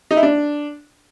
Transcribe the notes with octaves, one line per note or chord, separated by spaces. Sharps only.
D#4
E4
D4